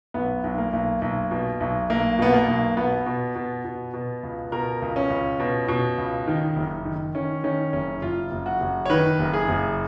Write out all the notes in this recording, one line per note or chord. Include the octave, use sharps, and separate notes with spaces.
B1 B3
B1
A#3
B1
B1
B2
B1
B1 A#3
B2 B3
A#3
B1
B2 B3
B2
B2
B2
B2
C#2
B2 A#4
C#2
C#4
C#2
B2
B2
C#2
D#3
F#1
D#3
D#3 C#4
D#3 C#4
F#1 C#4
F#1 F4
F#1
F#4
F#1
C#5
D#3 B4
F#1
G#4
F#1